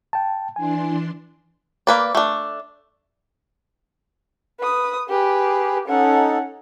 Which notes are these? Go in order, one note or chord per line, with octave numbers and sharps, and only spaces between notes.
G5 A5
E3 D4 G#5 C6
A#3 B4 D5
A3 D4
B4 D#6
G4 G#4 B4
C#4 D#4 A4 F#5